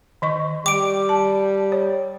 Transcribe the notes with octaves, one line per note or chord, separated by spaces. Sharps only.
D#3 D#5 C#6
G3 G5 D6 D7
A5
C#5